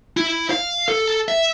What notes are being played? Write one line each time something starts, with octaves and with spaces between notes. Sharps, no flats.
E4
F5
A4
E5